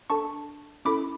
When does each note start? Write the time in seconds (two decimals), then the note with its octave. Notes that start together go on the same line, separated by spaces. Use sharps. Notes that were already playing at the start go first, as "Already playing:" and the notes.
0.10 D4 A4 A5 C#6
0.85 C#4 E4 A4 B5 D6